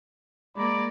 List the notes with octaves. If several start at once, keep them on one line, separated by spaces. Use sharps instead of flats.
G#3 A#3 D5 A#5 B5